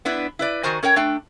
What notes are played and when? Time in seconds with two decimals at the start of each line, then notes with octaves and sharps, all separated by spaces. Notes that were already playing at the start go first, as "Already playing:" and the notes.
0.05 B3 D4 E4 B4
0.39 E4 B4 D5
0.63 D#3 F#4 A#4 C5 G#5
0.83 C#4 A#4 C#5 G5
0.96 A3 D4 G5